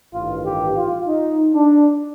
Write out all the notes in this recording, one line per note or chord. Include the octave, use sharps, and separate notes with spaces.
A1 G2 D#3 F4
G4
F4
D#4
D4